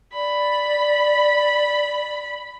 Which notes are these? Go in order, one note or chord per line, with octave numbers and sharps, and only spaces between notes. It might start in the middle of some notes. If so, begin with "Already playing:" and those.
D5 B5